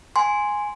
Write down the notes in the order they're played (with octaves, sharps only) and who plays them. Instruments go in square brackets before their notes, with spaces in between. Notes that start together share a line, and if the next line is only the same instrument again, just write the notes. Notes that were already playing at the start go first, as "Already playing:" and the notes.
[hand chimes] G#5 C6